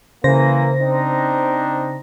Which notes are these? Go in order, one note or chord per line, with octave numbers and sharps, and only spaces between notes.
C#3 E3 A#3 C5 A#6
C4 D4 D#4